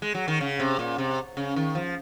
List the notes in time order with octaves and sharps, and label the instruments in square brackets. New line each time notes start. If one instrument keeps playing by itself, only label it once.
[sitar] G#3
F#3
D#3
C#3
C3
A#2
C3
C#3
D#3
F3